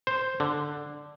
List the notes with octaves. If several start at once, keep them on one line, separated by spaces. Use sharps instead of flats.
C5
D3